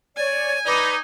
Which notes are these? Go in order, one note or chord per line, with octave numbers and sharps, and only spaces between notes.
C#5 D5 G#5
D#4 B4 D5 D6